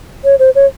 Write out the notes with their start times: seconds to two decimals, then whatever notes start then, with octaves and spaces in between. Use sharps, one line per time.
0.25 C#5
0.39 C5
0.55 C#5